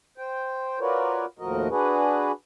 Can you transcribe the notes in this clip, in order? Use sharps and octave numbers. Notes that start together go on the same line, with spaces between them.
C5 G5
F4 F#4 A#4 B4 C#5 D5
D#2 A2 F3 F#4 A#4 D#5
D4 F#4 G#4 B4